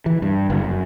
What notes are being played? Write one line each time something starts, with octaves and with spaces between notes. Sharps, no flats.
E3
G2
F#1
F#2